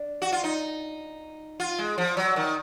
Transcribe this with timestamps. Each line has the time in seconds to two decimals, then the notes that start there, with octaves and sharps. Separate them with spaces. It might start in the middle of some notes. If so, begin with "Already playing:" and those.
Already playing: D4
0.22 F#4
0.32 F4
0.44 D#4
1.60 F4
1.78 G#3
1.98 F3
2.17 F#3
2.36 D#3